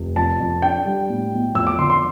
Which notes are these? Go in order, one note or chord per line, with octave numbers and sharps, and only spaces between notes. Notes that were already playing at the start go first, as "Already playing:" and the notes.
Already playing: F1
F2 A5
F2
D4 G5
G3
A2
B1
F2 E6
D6
D3 C6
C6